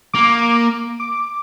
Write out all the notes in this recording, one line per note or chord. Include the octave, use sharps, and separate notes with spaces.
A#3 D6
D6
D6